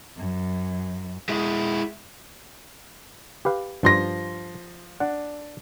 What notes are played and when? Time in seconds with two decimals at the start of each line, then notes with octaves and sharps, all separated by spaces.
0.17 F#2
1.29 G#3 E4
3.45 G4 B4 F5
3.83 G2 F3 C6 A#6
5.00 D4 F#5